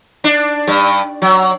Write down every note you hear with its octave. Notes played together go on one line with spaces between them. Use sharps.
D4
G2
F#3